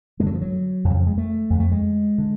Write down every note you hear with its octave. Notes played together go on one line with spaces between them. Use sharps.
F#2 D3 F#3 G#3
F3
F#3
F2 C#3 D3 F#3
F3
G#3
A3
F2 D3
A3
G#3
D3